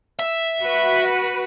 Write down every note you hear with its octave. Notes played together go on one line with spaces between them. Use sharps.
E5
F#4 B4